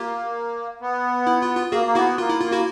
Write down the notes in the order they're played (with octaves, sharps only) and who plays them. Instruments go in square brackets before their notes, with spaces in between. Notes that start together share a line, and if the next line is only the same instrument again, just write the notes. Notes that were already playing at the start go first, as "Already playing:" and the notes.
Already playing: [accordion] A#3 [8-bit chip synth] F4 G4
[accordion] B3
[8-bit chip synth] E4
F4
F4
[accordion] A#3 [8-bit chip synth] F#4 G#4
[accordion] A#3
[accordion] B3 [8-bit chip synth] E4 F#4
[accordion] A#3 [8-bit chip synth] F4
[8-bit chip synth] E4
[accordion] A#3 [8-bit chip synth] F4
[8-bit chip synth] E4 F#4